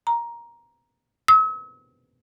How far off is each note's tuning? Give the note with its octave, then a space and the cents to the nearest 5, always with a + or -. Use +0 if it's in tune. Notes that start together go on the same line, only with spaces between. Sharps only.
A#5 +10
E6 -45